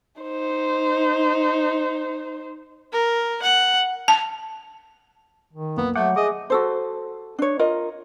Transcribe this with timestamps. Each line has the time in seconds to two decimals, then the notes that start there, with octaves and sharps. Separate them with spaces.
0.21 D#4 C5
2.92 A#4
3.42 F#5
4.08 A5
5.53 D#3
5.77 C2 F#2 A#3 B3
5.96 F#3 A3 F#5 D6 G6
6.16 G#4 D#5 E5 D6
6.50 F#4 A4 C5
7.39 D4 C#5
7.59 F4 A#4 D#5